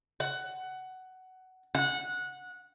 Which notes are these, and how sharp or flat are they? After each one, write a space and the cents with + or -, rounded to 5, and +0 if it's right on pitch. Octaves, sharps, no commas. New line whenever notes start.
F#5 +15
F#5 -15